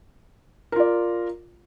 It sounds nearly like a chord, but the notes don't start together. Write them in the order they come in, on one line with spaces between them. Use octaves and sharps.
A#4 F4 D5